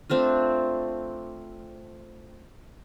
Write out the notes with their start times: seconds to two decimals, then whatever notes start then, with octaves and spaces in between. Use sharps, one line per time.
0.10 A3 C4 D4 F4